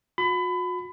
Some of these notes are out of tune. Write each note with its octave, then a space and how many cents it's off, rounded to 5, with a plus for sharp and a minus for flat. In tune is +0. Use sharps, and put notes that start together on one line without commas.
F#4 -40 B5 +25